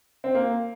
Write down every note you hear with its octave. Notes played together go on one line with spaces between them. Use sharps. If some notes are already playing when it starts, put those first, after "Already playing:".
C4
A#3